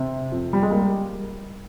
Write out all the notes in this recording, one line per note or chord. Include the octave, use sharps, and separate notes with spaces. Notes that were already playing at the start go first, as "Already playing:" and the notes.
Already playing: C3
F2
G3
G#3
G3 A#3